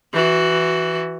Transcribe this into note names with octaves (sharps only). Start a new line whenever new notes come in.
E3 F#4